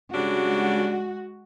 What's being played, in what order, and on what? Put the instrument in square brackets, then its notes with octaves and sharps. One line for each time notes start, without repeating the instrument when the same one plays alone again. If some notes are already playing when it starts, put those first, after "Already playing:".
[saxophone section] C#3 G3 D4 [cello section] G#3 F#4